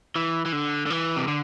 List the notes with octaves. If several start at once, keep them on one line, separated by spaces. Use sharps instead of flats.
E3
E3
D3
D3
E3
C3
D3